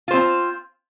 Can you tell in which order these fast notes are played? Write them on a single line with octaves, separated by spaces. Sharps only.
F4 C5 C4